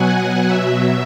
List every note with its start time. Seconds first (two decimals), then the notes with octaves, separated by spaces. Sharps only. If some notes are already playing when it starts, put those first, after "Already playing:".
Already playing: B2 F#3 F#5 G#5
0.18 F#5
0.46 B2 F#3 E5